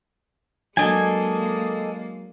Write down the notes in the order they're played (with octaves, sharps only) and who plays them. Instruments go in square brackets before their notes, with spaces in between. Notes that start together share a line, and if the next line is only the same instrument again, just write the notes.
[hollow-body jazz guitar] F#3 D4 [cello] G#3 A#3 [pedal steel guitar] A4 D#5 G#5